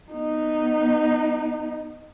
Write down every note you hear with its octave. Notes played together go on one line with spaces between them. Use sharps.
B3 D#4